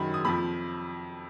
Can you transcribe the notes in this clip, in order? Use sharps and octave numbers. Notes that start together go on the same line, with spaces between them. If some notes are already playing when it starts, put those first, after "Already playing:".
Already playing: F#2 D#3 F#3 B5
D#6
F2 F3 B5